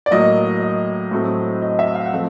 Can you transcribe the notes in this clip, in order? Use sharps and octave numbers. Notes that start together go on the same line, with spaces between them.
D5
A2 F#3 A#3 D#5
D#5
A2 F#3 A3 C4
D#5
E5
F5
F#5
F3 A3 C4